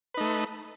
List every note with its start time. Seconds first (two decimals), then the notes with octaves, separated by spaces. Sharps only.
0.14 B4
0.17 D#4
0.20 A3